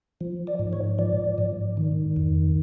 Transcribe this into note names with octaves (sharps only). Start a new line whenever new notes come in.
F3
D5
G#2
C#5
F3 D5
G#2
D#3
F2